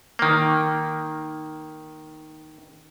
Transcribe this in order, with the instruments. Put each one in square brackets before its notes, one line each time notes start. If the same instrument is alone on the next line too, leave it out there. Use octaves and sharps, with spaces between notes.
[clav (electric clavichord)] D#3 A#3